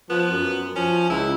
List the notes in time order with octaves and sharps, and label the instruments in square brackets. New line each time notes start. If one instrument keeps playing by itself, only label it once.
[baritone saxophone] F3 [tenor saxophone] B3
[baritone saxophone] F#2
[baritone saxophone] F3 [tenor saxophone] C#4
[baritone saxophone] C#2 [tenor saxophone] E4